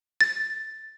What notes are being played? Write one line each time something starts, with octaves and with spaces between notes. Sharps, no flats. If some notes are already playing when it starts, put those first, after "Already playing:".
A6